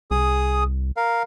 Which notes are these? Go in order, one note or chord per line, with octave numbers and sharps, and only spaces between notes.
C2 G#4 D#6
A#4 F5